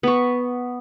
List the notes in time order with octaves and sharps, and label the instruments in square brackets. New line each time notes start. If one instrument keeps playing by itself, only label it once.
[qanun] B3 C#6